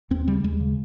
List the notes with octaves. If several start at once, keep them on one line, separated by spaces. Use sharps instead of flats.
D#2 C4
C#3 G3
D#2 G#3
C#3